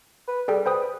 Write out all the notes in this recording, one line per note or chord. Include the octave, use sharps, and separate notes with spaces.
B4
G3 G#4 A4 G5
B4 C5 G5 D#6